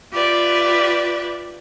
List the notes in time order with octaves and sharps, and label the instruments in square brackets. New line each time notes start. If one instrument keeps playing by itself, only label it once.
[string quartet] F4 G4 B4 D5 E5